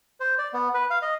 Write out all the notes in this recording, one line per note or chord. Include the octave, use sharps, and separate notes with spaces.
C5
D5
B3
B4
F5
D#5